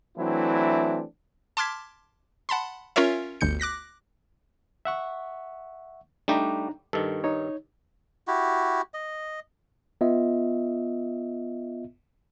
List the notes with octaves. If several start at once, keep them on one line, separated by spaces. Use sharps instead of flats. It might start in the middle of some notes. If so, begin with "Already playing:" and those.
E3 F#3 A3 C4 D4 E4
A5 C6 D6 F6 G#6 B6
F#5 A5 B5 C6
C#4 F4 A#4 C#5 E5
G1 D2 G6 C#7
D6 F#6 A#6 B6
E5 F#5 C#6
G3 A3 D4 D#4 G4 A#5
G2 D#3 A4
D#4 C#5
E4 F#4 G4
D#5
B3 F4 D#5 E5